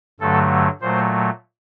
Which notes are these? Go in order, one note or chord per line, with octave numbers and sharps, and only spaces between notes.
G2 D3 F#3 A3 A4
A#2 F#3 A3 C5